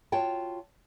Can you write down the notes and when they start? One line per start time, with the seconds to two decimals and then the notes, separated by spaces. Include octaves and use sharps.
0.12 F4 F#4 C#5 G5 A5